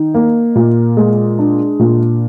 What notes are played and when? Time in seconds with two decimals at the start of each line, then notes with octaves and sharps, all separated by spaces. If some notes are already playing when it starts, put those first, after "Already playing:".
Already playing: D#3 D#4
0.14 A#3
0.56 A#2
0.97 G#3
1.39 D4
1.80 A#2